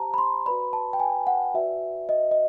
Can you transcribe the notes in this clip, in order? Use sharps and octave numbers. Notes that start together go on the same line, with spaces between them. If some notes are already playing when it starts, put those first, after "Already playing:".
Already playing: G4 C5 A5 A#5
B5
C6
F#4 B4 D5 B5
A5
G5
G#5
F#5
F#4 B4 D5 E5
D#5
D#5